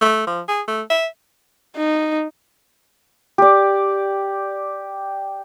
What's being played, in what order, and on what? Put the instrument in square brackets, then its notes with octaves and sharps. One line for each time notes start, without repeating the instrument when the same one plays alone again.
[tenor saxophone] A3
F3
G#4
A3
E5
[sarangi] D#4
[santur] G4 D5